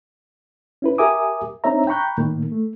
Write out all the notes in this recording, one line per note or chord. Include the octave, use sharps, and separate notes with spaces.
C#4 E4 B4
G4 A#4 E5 G#5 D6 D#6
C4 D4 D#4 C#5 E5 A#5
G5 A#5 B5 C#6 F#6 G6
A2 D#3 A#3
A3